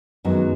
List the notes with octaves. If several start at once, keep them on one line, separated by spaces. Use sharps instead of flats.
F#2 D#3 F#3 G#3 B3 D#4